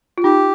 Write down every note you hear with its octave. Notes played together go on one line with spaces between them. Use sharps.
F4
D#4 G4